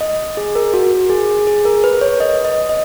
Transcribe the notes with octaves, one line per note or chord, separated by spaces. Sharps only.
D#5
G#4
A#4
F#4
G#4
G#4
A#4
B4
C#5
D#5
D#5
D#5